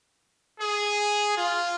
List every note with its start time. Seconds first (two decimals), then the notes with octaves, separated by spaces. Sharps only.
0.59 G#4
1.36 F4